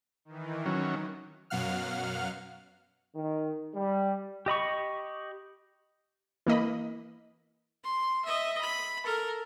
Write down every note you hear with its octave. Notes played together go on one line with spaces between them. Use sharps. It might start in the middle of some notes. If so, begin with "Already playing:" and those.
D#3 E3
D#3 F#3 C#4
F#2 B2 F#3 F5 F#5 F6
D#3
G3
G4 D#5 B5 C#6
E3 A#3 D#5 B5
C6
D#5 E5
B5
A4 A#4